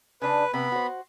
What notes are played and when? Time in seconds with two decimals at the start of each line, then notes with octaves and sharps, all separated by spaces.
0.22 C#3 D4 B4
0.54 C3 B3 B5
0.72 F#4 C5